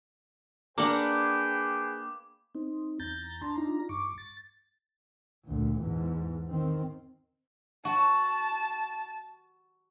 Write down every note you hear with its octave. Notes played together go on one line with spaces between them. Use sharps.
A#3 D4 G#4 B4 F#5 G5 D6
C4 D#4
E2 A#5 G6 A6
D4 A5 A#5 C6
D4 D#4 F4 A#5
G2 C#6 D6
A6
D2 A#2
E2 G#2
D#3 C4
F#4 A5